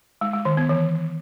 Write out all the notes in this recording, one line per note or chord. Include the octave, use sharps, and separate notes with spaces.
G#3
G#3
D#3
B3
E3